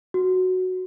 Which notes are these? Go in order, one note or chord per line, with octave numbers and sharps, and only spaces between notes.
F#4